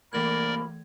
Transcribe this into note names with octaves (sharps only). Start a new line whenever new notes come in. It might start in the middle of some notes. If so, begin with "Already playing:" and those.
C2 E3 A3 A#3 A#4 D5 B5 G#6